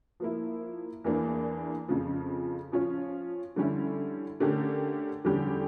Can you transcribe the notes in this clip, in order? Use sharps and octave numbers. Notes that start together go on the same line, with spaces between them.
F3 A#3 E4
E2 E3 A#3 D4
F2 C#3 F3
F3 C#4 F4 C#5
D3 G3 C#4 E4
D3 A3 C#4 G4 A#4
E2 D3 G3 C#4 G4